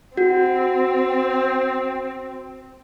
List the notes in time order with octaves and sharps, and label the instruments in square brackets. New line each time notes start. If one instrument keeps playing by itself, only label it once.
[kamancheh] C4 [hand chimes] F#4